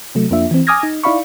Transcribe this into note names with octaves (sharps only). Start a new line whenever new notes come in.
C3 F#3 A3
F2 A#3 D4 F4 E5
E3 C4
G#5 D6 D#6 F6 G#6 A#6
D#4
D#4 E4 D5 F5 B5 C#6